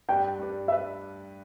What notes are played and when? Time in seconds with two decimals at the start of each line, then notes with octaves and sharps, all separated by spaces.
0.08 G2 G3 D4 B4 G5
0.39 G2 G3 D4 B4
0.68 G3 D4 B4 E5